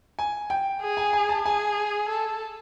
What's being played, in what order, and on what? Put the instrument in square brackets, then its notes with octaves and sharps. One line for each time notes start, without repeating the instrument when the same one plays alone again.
[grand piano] G#5
G5
[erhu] G#4
[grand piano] G#5
G#5
A5
[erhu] G#4 [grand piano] G#5
[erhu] A4